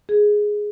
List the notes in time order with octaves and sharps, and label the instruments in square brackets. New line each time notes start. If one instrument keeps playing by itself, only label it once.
[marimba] G#4